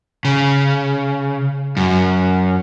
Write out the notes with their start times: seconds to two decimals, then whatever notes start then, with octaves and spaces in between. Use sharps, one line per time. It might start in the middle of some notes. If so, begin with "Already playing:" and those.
0.25 C#3
1.77 F#2